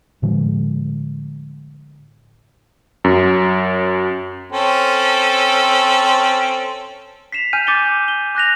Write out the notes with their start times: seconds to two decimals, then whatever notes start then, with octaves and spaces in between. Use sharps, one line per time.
0.22 A2 D3 F3 G#3
3.04 F#2
4.52 C4 C#4 A4
7.32 B6 C7 E7 F7
7.53 G#5 F6 G6 D#7
7.67 D6 G6 A6 C#7 G7
8.08 G7
8.35 D6 F#6 A#6 F7